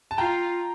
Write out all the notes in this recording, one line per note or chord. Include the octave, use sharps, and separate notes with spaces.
A5
F4 G5 A#5